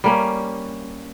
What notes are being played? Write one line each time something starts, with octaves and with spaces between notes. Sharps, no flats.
G3 A#3 C#4